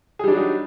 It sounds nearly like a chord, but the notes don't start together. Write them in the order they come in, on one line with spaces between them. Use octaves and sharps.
G#4 G3 D4 F#3 D#4